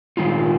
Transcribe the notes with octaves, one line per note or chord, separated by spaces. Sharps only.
D#3 G#3 D#4 F4